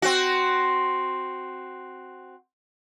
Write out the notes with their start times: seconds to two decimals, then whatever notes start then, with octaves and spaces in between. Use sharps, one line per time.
0.02 C4 F#4